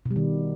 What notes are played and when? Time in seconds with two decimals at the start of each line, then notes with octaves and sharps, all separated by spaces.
0.05 B2
0.11 G3
0.16 D#3